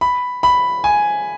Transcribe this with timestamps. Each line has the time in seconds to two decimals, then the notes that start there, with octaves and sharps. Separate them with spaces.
0.01 B5
0.43 B5
0.84 G#5